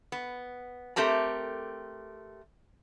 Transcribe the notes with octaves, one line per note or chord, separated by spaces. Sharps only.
B3
A3 C4 G4 A#4 A5